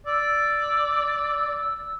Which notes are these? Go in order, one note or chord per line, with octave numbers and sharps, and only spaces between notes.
D5 E6